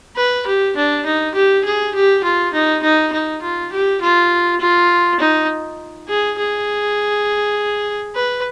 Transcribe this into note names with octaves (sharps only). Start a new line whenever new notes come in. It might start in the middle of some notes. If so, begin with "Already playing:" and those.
B4
G4
D4
D#4
G4
G#4
G4
F4
D#4
D#4
D#4
F4
G4
F4
F4
D#4
G#4
G#4
B4